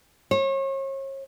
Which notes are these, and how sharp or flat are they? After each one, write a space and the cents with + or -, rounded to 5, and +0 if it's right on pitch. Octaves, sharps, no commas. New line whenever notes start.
C#5 -35